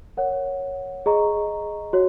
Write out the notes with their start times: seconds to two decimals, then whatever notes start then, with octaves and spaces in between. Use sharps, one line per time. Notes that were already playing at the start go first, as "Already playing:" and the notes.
0.17 A#4 C#5 F#5
1.06 G#4 D#5 A#5 C#6
1.93 F#4 C#5